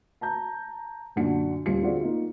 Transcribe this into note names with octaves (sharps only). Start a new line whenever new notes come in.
A5 A#5 G6
F#2 A#2 D3 D4 F#4 C#7
D#1 G3 F4 C#7
D3 C4 F4 F#4 G#4 D5
A#3 D#4 F4